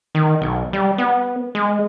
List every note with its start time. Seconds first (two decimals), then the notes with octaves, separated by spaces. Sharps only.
0.15 D#3
0.42 B1
0.73 G3
0.98 B3
1.55 G#3